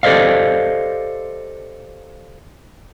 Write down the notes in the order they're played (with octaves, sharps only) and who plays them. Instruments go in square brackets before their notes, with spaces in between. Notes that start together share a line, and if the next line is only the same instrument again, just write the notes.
[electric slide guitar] G4 A4 C5 D5 D#5 F5